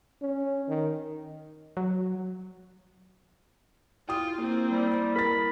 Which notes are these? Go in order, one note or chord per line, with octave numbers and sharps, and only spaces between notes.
C#4
D#3
F#3
E4 F4 G5 D#6
A#3 C4
G3
A#4 B5 A6